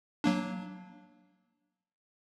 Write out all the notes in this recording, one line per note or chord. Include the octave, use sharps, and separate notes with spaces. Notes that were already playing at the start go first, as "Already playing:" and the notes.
F#3 A#3 D4